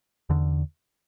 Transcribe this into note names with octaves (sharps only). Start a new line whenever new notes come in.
E2 D3